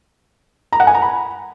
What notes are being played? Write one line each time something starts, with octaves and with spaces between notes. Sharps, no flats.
A#5
F#5
G#5
A#5
B5